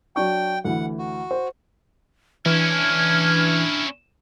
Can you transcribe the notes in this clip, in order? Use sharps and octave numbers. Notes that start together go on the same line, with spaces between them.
F#3 D4 G5 C#6
D2 E3 F#5
F#4
C5
E3 C#4 D4 E4 F6 G#6